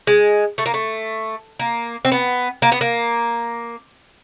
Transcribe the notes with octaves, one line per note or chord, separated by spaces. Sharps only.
G#3
A3
A#3
A3
A#3
C4
B3
A#3
B3
A#3